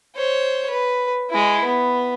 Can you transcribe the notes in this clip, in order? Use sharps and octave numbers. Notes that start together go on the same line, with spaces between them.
C5 C#5
B4
G#3 E4
B3